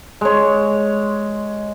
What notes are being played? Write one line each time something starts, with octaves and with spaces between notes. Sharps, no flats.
G#3 C#5